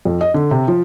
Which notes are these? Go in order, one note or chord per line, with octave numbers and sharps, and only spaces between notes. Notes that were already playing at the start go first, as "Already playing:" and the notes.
F2
D#5
D3
C3
F3